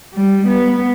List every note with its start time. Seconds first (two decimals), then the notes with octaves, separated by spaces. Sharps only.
0.14 G3
0.47 B3